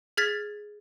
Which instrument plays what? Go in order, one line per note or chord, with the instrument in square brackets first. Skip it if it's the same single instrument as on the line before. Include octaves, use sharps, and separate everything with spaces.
[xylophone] G#4 F6 G#6 A6 B6